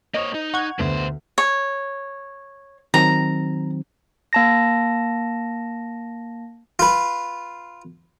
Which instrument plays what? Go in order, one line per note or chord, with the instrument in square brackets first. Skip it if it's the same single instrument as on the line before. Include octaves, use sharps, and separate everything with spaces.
[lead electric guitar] A#3 C#5 [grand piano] C5 F7 [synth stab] D#5
[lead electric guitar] D#4
[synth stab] F#5 G#6 [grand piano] C#6
[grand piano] D2 D3 B3 [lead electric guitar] B2 C5
[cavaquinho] C#5
[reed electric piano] D#3 F#3 C4 [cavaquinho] A#5
[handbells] A#3 A5 A#6
[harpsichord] F4 B4